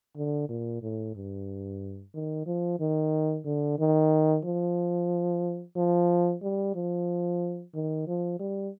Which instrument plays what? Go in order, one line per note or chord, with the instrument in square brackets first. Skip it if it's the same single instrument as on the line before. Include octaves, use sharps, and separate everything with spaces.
[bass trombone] D3
A#2
A2
G2
D#3
F3
D#3
D3
D#3
F3
F3
G3
F3
D#3
F3
G3